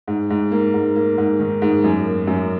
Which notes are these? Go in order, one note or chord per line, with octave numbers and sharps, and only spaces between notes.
G#2
G#2
A#3
G#2
A#3
G#2
D#3
G#2
F#2
A#3
F#2